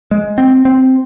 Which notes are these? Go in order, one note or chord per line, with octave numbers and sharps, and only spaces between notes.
G#3
C4
C4